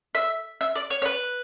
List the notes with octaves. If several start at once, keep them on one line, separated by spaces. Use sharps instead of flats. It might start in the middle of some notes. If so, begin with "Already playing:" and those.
E5
E5
D5
C#5
C#5
B4